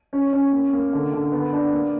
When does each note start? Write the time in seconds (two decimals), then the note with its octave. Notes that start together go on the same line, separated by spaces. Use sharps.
0.13 C#4
0.33 C#4
0.52 A#3
0.73 A#3
0.93 D3
1.13 D3
1.32 B3
1.53 D4
1.73 A#3